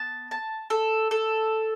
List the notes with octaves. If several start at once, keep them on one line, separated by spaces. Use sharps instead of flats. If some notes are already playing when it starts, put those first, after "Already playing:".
Already playing: B3 A5
A5
A4
A4